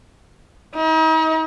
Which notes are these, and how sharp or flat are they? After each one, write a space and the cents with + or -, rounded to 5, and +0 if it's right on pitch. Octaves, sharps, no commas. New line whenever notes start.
D#4 +40